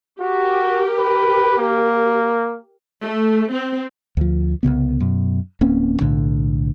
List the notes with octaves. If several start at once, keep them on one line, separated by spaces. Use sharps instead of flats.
F#4 G4 A#4
B4
A#3
A3
C4
D2 F3
C2 F#2 C#3 B3
F#2 B2
D1 A#3 C4 C#4
B1 A2 D3